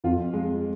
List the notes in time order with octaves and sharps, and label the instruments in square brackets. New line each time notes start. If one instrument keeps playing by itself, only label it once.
[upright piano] F2 [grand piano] F4
[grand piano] G#3